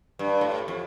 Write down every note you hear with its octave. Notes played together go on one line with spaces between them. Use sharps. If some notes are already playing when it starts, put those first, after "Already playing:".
G2
A2
F2